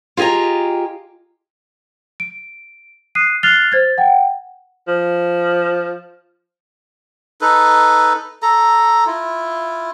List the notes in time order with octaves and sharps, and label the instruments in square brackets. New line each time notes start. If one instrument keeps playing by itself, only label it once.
[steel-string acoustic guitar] F4 G4 G#4 D#5 A#5
[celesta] D7
D#6 F#6 C7 D#7
F6 F#6 A6 C7 F7 G7
C5 G#6 A6
F#5 G5
[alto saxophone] F3
[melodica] D#4 A4 B4
A4 A#5
E4 F4